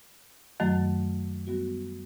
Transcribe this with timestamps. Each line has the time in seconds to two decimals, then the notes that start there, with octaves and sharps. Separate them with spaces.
0.60 F#2 D#3 F#3 A3
1.47 D#3 G3 B3 F#4